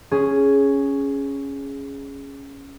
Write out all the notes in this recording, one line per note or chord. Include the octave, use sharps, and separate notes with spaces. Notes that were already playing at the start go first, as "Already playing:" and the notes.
C#4 G#4